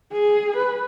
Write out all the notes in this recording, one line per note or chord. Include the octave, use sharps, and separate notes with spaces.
G#4
B4